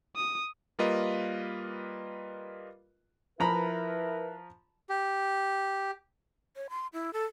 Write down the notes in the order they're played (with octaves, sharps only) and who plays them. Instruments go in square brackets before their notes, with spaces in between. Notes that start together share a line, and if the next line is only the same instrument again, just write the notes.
[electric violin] D#6
[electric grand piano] G3 A#3 F4 A#4 B4 D#5
[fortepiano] F3 A#5 B5 [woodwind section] E4 A#4 B4
[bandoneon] G4
[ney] C#5
C6
E4
A4